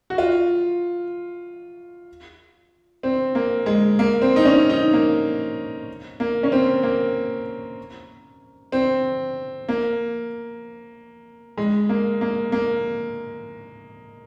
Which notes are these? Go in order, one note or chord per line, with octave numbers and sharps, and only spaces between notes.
F#4
F4
C4
A#3
G#3
A#3
C4
D#4
C#4
D#4
A#3
A#3
C#4
C4
A#3
C4
A#3
G#3
A#3
A#3
A#3